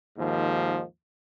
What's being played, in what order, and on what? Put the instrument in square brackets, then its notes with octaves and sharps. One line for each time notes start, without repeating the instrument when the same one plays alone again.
[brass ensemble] D#2 G#2 D#3 F3